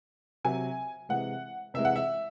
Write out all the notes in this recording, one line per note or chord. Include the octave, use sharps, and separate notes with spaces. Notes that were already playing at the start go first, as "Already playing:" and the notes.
C3 F#3 G#5
C3 E3 G#3 F#5
C3 E3 G#3 E5
F#5
E5